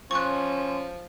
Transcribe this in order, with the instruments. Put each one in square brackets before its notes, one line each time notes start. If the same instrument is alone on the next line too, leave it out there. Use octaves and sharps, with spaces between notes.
[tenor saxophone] F3 [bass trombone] C#4 [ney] C6 [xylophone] C#6 F#6